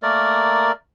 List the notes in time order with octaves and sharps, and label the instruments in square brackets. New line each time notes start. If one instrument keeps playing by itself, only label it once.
[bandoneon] A3 A#3 A#4 D5